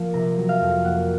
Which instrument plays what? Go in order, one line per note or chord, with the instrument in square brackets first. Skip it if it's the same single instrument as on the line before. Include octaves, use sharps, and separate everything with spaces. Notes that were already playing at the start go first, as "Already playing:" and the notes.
Already playing: [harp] F3 A#3
C3 A#5
F#3
F5
F2
A#3 F#5